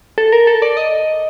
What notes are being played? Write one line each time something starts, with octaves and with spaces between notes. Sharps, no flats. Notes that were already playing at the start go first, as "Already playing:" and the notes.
A4
A#4
A4
D5
D#5